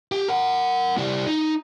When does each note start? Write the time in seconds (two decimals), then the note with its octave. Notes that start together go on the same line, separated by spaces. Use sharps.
0.12 G4
0.28 A#4 F#5
0.98 G3 E4
1.27 D#4